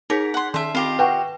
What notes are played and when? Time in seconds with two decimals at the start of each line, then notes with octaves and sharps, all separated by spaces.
0.10 D#4 G#4 A#4 B6
0.34 F#5 C6
0.54 D#3 E5 A5 C6
0.75 C4 F4 G4 D#5 C7
0.99 B4 F#5 G5 C#6